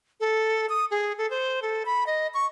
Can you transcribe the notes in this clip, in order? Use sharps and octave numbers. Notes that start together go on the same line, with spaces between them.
A4
D#6
G#4
A4
C5
A4
B5
D#5
C#6